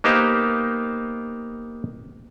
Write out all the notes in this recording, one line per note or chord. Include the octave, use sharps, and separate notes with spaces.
A#3 B3 D#4 G4 C5 F5